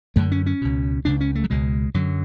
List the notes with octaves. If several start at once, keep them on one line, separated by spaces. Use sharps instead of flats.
F#2 D3 A3
C#4
C#4
C#2 B2
C#2 C#3 D4
C#4
A3
F#3
C#2 B2 G#3
F#2 D3 F#3